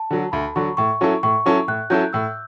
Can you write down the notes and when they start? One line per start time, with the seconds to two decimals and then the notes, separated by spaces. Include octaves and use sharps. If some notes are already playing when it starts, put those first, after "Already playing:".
Already playing: A5
0.10 D3 F#3
0.32 D2 B5
0.56 D3 F#3 C#6
0.77 A2 C#6
1.01 F#3 C#4 E4 A4
1.23 A2 C#6
1.46 F#3 C#4 E4 A4
1.68 A2 F#6
1.90 F#3 C#4 E4 A4 G6
2.13 A2 E6